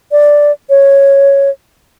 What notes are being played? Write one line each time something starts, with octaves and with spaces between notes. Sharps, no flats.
D5
C#5